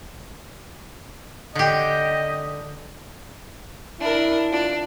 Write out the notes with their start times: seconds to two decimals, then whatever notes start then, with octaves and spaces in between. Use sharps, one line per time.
1.55 D3 G4 D#5
4.00 D4 E4 A#4
4.52 D4 F4